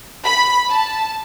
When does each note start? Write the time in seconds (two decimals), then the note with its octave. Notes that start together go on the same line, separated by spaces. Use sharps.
0.24 B5
0.70 A5